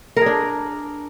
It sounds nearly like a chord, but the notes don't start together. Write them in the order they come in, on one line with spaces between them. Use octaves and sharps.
A#4 G#4 D4